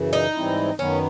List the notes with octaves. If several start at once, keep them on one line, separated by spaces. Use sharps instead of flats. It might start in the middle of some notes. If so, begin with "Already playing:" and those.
Already playing: F#2 C#3 E3
D#4
G#2 E3 G3 C4 E4
F#2 D#3 F#3 B3 C#4